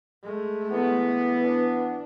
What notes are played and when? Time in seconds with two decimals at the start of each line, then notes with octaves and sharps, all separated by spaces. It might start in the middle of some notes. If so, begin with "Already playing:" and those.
0.23 G#3 A3
0.71 E3 B3
1.43 D4